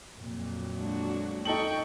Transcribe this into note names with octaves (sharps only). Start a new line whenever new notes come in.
F2 A#2 F#3
G#3 D4 F#4
D#4 A4 G5 C#6 F#7